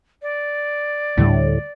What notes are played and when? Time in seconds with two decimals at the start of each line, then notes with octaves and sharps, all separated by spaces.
0.22 D5
1.17 D2 A2 D3 G3